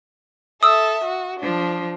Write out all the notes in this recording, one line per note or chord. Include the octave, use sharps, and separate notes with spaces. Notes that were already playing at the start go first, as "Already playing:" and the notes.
A4 E5 D#6 E6
F#4
F3 D4